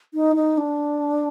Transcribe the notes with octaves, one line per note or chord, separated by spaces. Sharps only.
D#4
D#4
D4